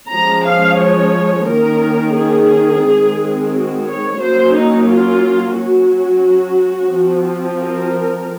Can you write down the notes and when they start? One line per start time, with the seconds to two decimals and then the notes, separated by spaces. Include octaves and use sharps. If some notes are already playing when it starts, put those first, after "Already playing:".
0.11 F3 G#3 C#4 A#5
0.46 F5
0.79 C#5
1.47 D#3 A#3 C#4 A#4
2.16 G#4
2.84 D#3 G#3 C4
3.52 F#4
3.87 C#5
4.21 F#3 A#3 C#4 C5
4.54 D#4
4.89 F4
5.57 F#3 C#4 F#4
6.94 F3 C4
7.62 A#4